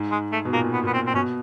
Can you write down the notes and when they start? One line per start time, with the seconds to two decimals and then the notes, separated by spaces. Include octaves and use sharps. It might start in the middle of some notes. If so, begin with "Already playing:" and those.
Already playing: G#2
0.11 G#3
0.32 A3
0.45 B2
0.53 A#2 A#3
0.73 B3
0.84 A#2 B3
0.94 C4
1.07 C4
1.14 B2 C#4